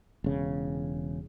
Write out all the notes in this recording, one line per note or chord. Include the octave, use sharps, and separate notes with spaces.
E1 C#3